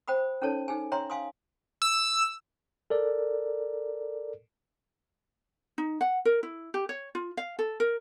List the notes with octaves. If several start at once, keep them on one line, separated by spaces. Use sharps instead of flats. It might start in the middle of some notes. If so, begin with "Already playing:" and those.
C5 G5 B5 D#6
C#4 D#4 A4 C#5 A5
D#4 G#4 G#5
C#5 E5 G5 A#5 C6
F5 G#5 C6 D#6
E6
A4 A#4 D5
D#4
F#5
A#4
E4
G4
C#5
F4
F5
A4
A#4